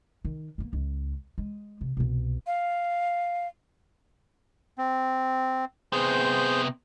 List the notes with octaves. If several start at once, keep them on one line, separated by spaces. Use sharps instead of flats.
D#3
A#3 B3
C#2
G#3
C3
C2 B2
F5
C4
C3 B3 G#4 C5 G6